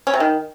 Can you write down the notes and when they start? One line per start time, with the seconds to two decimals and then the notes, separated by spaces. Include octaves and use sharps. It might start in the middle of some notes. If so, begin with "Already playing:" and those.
0.07 C#4
0.14 C3
0.20 D#3